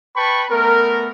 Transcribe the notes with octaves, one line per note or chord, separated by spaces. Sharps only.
B4 G5 A5 B5 C#6
A3 B3 A#4